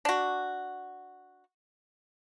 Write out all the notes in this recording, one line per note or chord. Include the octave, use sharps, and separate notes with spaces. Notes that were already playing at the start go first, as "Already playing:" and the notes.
D4 F#4